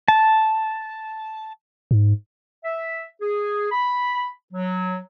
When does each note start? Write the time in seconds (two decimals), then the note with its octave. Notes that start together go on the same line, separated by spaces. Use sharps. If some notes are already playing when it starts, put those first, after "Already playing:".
0.08 A5
1.91 G#2
2.64 E5
3.21 G#4
3.72 B5
4.53 F#3